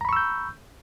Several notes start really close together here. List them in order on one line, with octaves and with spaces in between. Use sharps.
A#5 B5 C#6 E6 G6